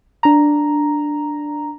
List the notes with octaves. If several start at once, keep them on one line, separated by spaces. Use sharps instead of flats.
D4 A#5